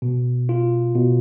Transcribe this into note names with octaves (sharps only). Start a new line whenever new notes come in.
B2
F4
B2